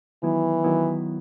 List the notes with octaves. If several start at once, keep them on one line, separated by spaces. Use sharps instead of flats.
D#3 E3 F#3 B3 E4
D#3 F#3 B3 E4